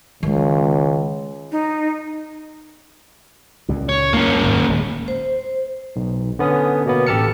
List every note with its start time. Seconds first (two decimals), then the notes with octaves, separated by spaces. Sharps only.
0.23 C#2 D#3 G#3
1.52 D#4
3.68 C#2 A#2
3.89 C#5
4.13 C#2 F#2 A#3 C#4
4.44 G#1 D#2 A#2
4.68 D1 G3 G#3
5.08 C5
5.96 B1
6.39 D3 B3 C#4 D#6
6.85 B2 A#3 B3
7.07 A1 G4 A4 A5 F6 C#7